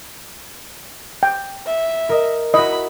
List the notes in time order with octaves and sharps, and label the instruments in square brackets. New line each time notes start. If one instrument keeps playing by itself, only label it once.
[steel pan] G5
[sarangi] E5
[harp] A#4 D#5
[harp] E4 F#4 [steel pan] D#5 [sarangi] B5